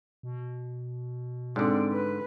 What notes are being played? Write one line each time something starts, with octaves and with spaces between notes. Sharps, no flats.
B2
G#2 D3 C4 D5
B4